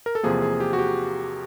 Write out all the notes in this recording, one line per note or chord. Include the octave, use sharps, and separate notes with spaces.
A#4
A4
E2 C3 F3 A#3 G#4
G#4
G4
F#4
G4